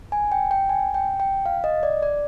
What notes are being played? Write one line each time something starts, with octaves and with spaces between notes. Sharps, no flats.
G#5
G5
G5
G#5
G5
G5
F5
D#5
D5
D5